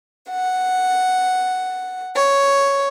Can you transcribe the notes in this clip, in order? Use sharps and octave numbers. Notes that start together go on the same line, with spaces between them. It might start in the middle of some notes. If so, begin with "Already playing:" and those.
F#5
C#5